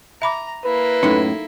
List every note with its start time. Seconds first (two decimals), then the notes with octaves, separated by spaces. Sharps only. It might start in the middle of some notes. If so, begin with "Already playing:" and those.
0.22 E5 A#5 B5 D6
0.65 A#3 E4 B4
1.03 F#2 A2 C#4 D#4 A4